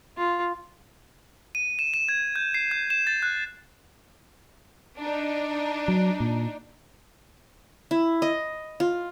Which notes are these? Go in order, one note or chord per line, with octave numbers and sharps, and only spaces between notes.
F4
D#7
E7
E7
G#6
G6
C7
G6
E7
A6
F#6
D4 D#4
F#3
A#2
E4
D#5
F4